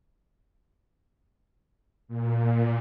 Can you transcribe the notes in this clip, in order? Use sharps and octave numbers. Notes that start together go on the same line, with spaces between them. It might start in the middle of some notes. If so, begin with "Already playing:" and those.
A#2